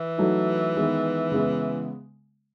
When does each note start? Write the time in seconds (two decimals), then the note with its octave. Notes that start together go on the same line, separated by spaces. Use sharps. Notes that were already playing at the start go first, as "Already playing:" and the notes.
Already playing: E3
0.18 F#3 A3 D#4
0.76 D#3 G#3 B3 E4
1.32 C#3 G#3 B3